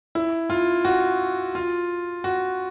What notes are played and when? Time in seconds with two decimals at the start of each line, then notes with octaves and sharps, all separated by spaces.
0.15 E4
0.50 F4
0.85 F#4
1.55 F4
2.24 F#4